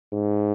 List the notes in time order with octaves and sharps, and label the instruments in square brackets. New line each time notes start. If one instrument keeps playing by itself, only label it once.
[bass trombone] G#2